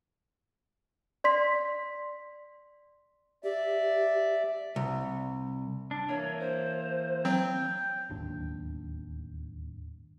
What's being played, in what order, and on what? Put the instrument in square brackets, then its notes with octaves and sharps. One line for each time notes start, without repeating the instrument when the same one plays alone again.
[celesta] D5 C6 B6
[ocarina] G4 [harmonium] D5 E5
[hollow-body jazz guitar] C2
[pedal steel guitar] D4
[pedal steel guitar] E3 A#3 [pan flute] C#5
[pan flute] C5
[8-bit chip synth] F#3 C4 [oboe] G5
[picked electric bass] D1 G1 D#2 D4